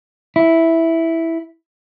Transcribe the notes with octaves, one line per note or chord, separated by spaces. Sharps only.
E4